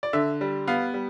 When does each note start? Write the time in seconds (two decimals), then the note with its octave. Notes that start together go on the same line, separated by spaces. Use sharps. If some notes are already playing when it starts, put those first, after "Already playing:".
0.03 D5
0.13 D3 E5
0.41 G3
0.67 B3 F5
0.94 G3